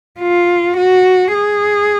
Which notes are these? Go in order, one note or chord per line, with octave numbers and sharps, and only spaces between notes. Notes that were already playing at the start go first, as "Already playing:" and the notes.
F4
F#4
G#4